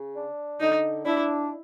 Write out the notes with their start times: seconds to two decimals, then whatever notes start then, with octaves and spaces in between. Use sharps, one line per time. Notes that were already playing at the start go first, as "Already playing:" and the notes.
Already playing: C#3
0.15 D4
0.60 D3 D#4
1.05 D4 E4